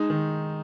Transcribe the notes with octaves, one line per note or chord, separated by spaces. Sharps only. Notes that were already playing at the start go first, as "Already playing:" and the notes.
Already playing: G#3 D#4
D#3